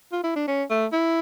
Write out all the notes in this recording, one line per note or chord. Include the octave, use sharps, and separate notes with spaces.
F4
E4
D4
C#4
A3
E4